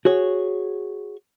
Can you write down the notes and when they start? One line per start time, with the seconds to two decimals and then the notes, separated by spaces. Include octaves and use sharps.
0.05 F#4 G#4 C#5